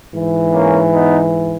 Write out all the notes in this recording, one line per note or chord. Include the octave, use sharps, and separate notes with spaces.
G#2 E3
A#3 C#4
B3 D#4